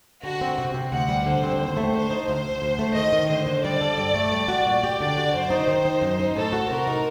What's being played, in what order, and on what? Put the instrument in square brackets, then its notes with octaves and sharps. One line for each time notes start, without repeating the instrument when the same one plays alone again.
[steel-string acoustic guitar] D3 [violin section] F#4
[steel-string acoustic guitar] C4
C3
C3
[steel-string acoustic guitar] D2 [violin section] F#5
[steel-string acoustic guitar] G3
[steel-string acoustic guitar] D3 [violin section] C5
[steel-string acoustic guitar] C4
D#2
A3
[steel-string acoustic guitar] D3 [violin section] C5
[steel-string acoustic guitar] D#4
[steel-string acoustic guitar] D2 [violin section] C5
[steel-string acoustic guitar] D2
D2
A3
[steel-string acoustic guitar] D#3 [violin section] D#5
[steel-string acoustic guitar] D#3
[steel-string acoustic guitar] D3 [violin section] C5
[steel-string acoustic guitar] D3
[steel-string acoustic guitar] G3 [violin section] D5
[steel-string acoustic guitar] A4
G2
A3
G3
F#4
A#2
G4
[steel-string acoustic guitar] D3 [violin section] D5
[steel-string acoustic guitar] F#4
[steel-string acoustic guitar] F#2 [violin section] C5
[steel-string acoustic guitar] D#4
D#3
D#4
F#2
D#4
[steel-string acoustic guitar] A2 [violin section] A4
[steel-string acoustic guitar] F#4
[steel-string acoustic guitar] C3 [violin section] A#4
[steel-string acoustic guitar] D#4